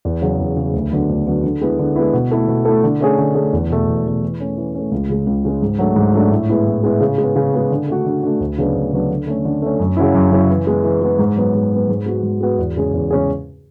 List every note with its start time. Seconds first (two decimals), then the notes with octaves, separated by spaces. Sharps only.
0.05 E2
0.22 C#3 F#3
0.40 E2
0.56 C#3 F#3
0.73 D2
0.91 D3 F#3 B3 F#4
1.09 D2
1.27 D3 F#3 B3 F#4
1.44 D3
1.61 G#3 B3 E4
1.79 D3
1.96 G#3 B3 E4
2.13 B2
2.31 A3 E4 A4
2.48 B2
2.65 A3 E4 A4
2.84 D3
3.01 A3 C#4 G#4
3.18 D3
3.35 A3 C#4 G#4
3.53 E2
3.70 B2 A3
3.88 E2
4.04 B2 A3
4.23 E3
4.40 A3 C#4
4.57 E3
4.75 A3 C#4
4.91 C#2
5.09 C#3 G#3
5.27 C#2
5.45 C#3 G#3
5.62 G#2
5.79 F#3 A3 D4
5.96 G#2
6.13 F#3 A3 D4
6.32 A2
6.49 G#3 B3 E4
6.66 A2
6.84 G#3 B3 E4
7.01 C#3
7.18 G#3
7.23 B3
7.36 C#3
7.54 G#3 B3
7.71 D3
7.88 A3 D4 F#4
8.06 D3
8.23 A3 D4 F#4
8.40 D2
8.58 C#3 F#3 B3 D4
8.75 D2
8.92 C#3 F#3 B3 D4
9.10 D3
9.27 A3 C#4
9.45 D3
9.62 A3 C#4
9.79 F#2
9.97 C#3 F#3 C#4 E4
10.15 F#2
10.31 C#3 F#3 C#4 E4
10.50 E3
10.67 G#3 B3
10.84 E3
11.02 G#3 B3
11.19 G#2
11.37 F#3 B3
11.54 G#2
11.72 F#3 B3
11.89 G#2
12.06 G#3 B3 F#4
12.23 G#2
12.41 G#3 B3 F#4
12.59 E2
12.76 C#3 G#3 C#4 G#4
12.94 E2
13.10 C#3 G#3 C#4 G#4